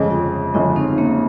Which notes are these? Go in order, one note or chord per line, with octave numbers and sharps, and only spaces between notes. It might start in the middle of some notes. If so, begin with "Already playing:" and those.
Already playing: G1 F2 C#3 G#3
F4 G#4
G1 F2 C#3 G#3 C#4 F4
C4 D#4
A#3 C#4